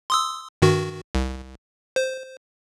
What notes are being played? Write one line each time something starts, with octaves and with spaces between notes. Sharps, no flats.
C6 D#6 E6
G2 D#3 F#4
C2
C5